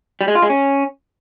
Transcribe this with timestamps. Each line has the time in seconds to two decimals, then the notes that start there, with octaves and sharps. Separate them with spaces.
0.21 G3
0.28 G#3
0.35 F4
0.42 G#3
0.50 C#4